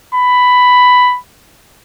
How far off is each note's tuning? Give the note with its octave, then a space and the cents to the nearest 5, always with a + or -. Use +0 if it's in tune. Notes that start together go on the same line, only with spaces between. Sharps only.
B5 +10